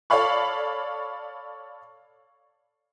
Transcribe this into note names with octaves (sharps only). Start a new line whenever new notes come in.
A4 C#5 D5 F5 B5 C#6